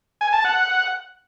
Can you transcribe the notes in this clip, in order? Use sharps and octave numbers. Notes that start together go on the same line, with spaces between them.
G#5
A5
F#5